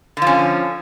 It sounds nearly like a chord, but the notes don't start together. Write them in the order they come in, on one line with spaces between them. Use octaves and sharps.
D3 F3 C#4